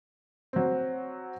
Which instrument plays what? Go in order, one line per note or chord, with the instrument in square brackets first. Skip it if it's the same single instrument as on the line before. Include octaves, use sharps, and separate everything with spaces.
[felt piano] F#3 C4